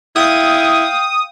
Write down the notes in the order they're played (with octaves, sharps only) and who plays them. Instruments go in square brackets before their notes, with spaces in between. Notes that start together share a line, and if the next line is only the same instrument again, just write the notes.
[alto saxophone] E4 [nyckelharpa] F5 G5 [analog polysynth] D#6